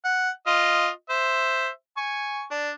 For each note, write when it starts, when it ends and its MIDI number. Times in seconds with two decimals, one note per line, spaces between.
0.05 0.30 78
0.47 0.89 65
0.47 0.89 75
1.10 1.68 72
1.10 1.68 76
1.97 2.43 80
1.97 2.43 85
2.51 2.71 62